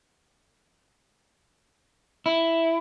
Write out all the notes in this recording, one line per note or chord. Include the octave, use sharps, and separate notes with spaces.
E4